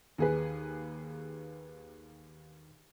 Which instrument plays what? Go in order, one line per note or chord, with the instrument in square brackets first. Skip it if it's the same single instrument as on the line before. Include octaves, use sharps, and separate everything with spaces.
[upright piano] D#2 G#4 B4